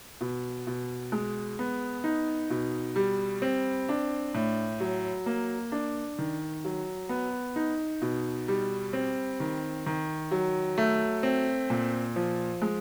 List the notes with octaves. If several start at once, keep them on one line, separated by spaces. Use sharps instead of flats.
B2
B2
G#3
B3
D#4
B2
G3
C4
D4
A2
F#3
A#3
D4
D#3
F#3
B3
D#4
B2
G3
C4
D#3
D#3
F#3
A3
C4
A#2
F3
G#3